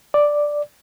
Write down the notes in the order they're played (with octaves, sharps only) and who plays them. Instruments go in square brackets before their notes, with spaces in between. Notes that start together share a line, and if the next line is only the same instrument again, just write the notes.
[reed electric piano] D5